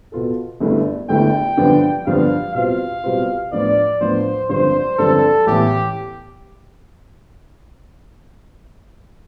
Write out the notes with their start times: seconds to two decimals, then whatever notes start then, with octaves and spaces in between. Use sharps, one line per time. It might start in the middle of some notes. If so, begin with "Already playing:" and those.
0.12 B2 B3 F4 A4
0.60 G1 G2 D3 A3 E4
1.09 G1 G2 D3 A3 E4 G5
1.57 G2 D3 F3 B3 D4
2.06 G2 D3 F3 B3 D4 F5
2.54 B2 G3 C4 F4 F5
3.04 B2 G3 C4 F4
3.52 A2 F3 B3 D4 D5
4.01 A2 F3 B3 D4 C5
4.49 G2 D3 F3 C4 C5
4.98 G2 D3 F3 C4 A4
5.46 A1 A2 E3 B3 G4